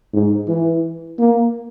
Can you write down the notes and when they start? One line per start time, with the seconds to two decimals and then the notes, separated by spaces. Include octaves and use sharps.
0.13 G#2
0.48 E3
1.19 A#3